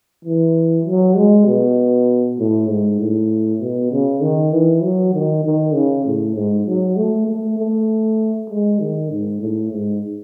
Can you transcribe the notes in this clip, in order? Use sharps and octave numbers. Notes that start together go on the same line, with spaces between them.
E3
F#3
G#3
B2
A2
G#2
A2
B2
C#3
D#3
E3
F#3
D#3
D#3
C#3
A2
G#2
F#3
A3
A3
A3
G#3
D#3
G#2
A2
G#2